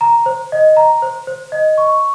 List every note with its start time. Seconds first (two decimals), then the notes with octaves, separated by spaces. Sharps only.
0.01 A#5
0.26 C5
0.52 D#5
0.77 A#5
1.02 C5
1.27 C5
1.52 D#5
1.78 C#6